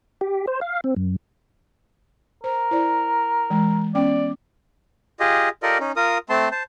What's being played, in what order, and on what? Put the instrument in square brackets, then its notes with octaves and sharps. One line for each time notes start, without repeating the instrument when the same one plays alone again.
[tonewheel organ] G4
C5
F5
C4
F#2
[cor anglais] A#4 [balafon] C5
[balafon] E4 C5 D5
E3 G#3
[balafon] B3 C#4 G5 [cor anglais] D5
[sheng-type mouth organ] F4 G4 G#4 D#5
F4 G4 A4 A#4 D5 D#5
C#4 D#4
F4 A#4 D#6
A3 C4 A5 C6
C5 A5